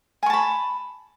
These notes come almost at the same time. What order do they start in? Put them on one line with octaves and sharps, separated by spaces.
G#5 C#6 A5 B5